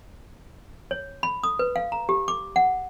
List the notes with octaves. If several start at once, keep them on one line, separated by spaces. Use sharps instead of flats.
C#5
B5
D#6
B4
F5
A#5
G4
D6
F#5